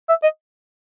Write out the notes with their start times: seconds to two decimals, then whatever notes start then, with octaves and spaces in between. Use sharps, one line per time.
0.09 E5
0.23 D#5